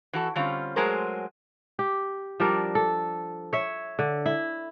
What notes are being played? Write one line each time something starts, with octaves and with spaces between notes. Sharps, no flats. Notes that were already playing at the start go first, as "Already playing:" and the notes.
E3 F#4 A4
D3 G3 C4 C#4 F4
F#3 G#3 A3 G#4 A#4 C5
G4
F3 G3 D4 A#4
A4
C#5 E5
D3
E4